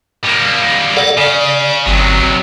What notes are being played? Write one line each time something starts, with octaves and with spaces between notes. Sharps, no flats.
G3 A#3
A4 D5 F#5
C#3 D5
G1 C3 F#3